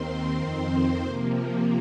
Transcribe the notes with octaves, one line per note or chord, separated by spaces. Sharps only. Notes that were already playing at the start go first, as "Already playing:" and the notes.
Already playing: D#2 D#3 C4 C5
F2 D#3 C4
C3 F3 A#3